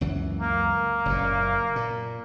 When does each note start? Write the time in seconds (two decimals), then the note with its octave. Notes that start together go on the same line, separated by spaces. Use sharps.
0.01 C#2 F#2 E3
0.40 A#3
1.06 F#1 F#2 A#2
1.76 A#2